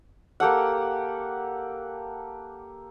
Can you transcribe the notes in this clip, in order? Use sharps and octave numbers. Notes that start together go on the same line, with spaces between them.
A#3 G4 A4 F#5